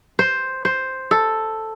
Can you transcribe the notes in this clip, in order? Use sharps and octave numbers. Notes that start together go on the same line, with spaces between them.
C5
C5
A4